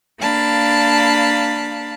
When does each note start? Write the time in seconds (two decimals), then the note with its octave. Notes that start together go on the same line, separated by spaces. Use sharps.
0.19 A#3 D4 F5 A5 B5